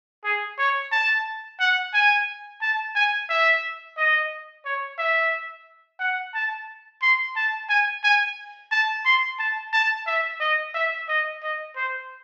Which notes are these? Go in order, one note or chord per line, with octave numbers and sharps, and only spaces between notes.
G#4
C#5
A5
F#5
G#5
A5
G#5
E5
D#5
C#5
E5
F#5
A5
C6
A5
G#5
G#5
A5
C6
A5
A5
E5
D#5
E5
D#5
D#5
C5